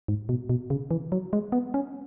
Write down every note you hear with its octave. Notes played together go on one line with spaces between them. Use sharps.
G#2
B2
B2
C#3
E3
F#3
G#3
B3
C#4